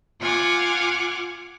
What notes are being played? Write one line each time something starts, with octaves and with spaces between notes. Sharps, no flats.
F4 F#5 G#5 D6 F6